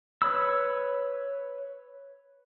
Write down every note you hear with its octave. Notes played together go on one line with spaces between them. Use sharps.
B4 C#5 B5 E6